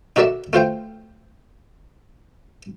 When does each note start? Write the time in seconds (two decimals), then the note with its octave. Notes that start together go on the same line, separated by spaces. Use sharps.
0.16 D#4 F#4 A4 A#4 D5 E5
0.53 A3 F4 C5 G5